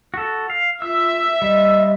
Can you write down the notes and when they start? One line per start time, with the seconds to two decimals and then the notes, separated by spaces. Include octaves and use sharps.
0.14 F#4 A4
0.50 F5
0.82 F4 E5 E6
1.42 G3 D#5